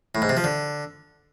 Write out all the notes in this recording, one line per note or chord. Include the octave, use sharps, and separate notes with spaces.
A2
G#2
C3
F3
D3